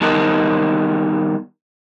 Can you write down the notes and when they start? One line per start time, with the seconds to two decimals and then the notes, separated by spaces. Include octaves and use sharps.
0.01 D#3 G3 B3 D#4 A#4 A5